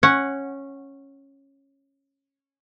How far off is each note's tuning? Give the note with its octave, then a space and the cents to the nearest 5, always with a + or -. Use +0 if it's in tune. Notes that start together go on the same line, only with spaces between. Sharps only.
C#4 -10 F#5 +0